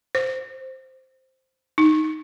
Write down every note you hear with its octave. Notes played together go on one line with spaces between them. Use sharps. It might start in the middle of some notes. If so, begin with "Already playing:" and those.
C5
D#4